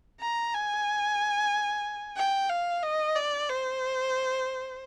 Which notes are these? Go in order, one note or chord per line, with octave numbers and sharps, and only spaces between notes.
A#5
G#5
G5
F5
D#5
D5
C5